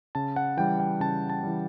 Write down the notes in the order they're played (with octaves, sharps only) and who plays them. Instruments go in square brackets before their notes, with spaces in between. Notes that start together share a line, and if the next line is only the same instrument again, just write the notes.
[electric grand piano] C#3 A5
F#5
E3 G3 G5
G5
C#3 A5
A5
E3 G3